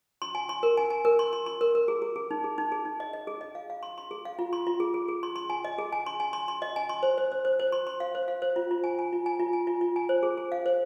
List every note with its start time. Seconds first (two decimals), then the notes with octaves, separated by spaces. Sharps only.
0.22 C6
0.35 G#5
0.49 C6
0.63 A#4
0.77 G#5
0.90 G#5
1.05 A#4
1.19 C6
1.33 C6
1.46 C6
1.61 A#4
1.75 A#4
1.88 G#4
2.02 G#4
2.16 G#4
2.31 D#4
2.44 G#4
2.58 D#4
2.72 G#4
2.85 D#4
3.00 D#5
3.13 D#5
3.27 G#4
3.41 D#5
3.55 F5
3.70 F5
3.83 C6
3.98 C6
4.11 G#4
4.25 F5
4.39 F4
4.53 C6
4.67 F4
4.80 G#4
4.94 G#4
5.08 G#4
5.23 C6
5.36 C6
5.50 G#5
5.65 D#5
5.78 G#4
5.92 G#5
6.06 C6
6.20 G#5
6.33 C6
6.48 C6
6.62 D#5
6.76 G#5
6.89 C6
7.03 C5
7.18 C5
7.32 C5
7.45 C5
7.60 C5
7.72 C6
7.87 C6
8.00 F5
8.15 C5
8.28 F5
8.42 C5
8.56 F4
8.71 F4
8.84 G#5
8.99 G#5
9.13 F4
9.26 G#5
9.40 F4
9.53 G#5
9.67 F4
9.81 F4
9.96 G#5
10.09 C5
10.23 G#4
10.37 G#4
10.52 F5
10.66 C5